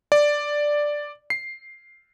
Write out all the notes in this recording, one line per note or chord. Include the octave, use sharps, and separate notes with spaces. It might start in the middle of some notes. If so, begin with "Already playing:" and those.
D5
C7